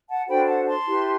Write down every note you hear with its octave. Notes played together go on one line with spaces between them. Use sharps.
F#5 A5
D4 F#4 A4 C5 G5 B5
F#5 A5
A5 C6
E4 G4 B4